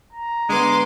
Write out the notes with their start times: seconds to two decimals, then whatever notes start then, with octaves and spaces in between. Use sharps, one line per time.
0.13 A#5
0.49 D3 G#3 B3 C6 D6